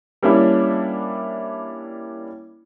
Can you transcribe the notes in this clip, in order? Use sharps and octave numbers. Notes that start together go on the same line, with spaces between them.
G3 A#3 C#4 D4 E4